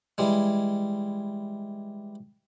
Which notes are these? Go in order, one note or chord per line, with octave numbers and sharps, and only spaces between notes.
E3 G3 G#3